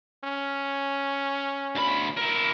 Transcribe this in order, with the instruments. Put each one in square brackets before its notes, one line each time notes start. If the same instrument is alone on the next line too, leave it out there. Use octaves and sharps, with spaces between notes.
[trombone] C#4
[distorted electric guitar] D2 B5
E4 A#4